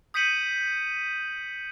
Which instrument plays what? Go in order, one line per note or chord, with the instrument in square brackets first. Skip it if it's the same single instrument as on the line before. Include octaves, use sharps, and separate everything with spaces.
[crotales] D#6 G6 B6 C#7 D#7 F#7